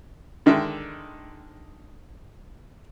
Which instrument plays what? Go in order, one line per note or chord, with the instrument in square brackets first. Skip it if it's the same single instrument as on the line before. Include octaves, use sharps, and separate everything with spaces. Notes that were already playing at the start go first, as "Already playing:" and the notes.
[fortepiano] D3 D#3 G#3 E5 G5